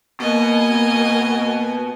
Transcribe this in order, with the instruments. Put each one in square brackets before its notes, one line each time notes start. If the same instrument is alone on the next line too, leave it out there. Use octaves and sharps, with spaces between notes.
[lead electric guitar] B2 [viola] A#3 [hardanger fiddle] D#5 G#5